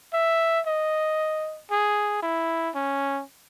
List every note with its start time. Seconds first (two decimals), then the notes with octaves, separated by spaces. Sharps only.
0.13 E5
0.67 D#5
1.70 G#4
2.23 E4
2.75 C#4